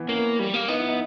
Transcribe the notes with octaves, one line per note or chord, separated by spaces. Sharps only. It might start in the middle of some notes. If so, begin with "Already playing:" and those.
Already playing: E3 B3
A#3 C#4
G3
A#3
B3 D#4
E4
D#4